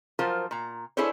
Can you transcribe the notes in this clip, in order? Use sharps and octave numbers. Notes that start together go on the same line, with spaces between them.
F3 F#3 F4 A#4 C5
A#2 A#5
D4 E4 G#4 A4 C5 C#5